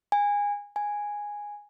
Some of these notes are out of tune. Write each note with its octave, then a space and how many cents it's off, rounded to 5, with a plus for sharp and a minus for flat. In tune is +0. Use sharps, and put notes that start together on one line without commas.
G#5 -20
G#5 -5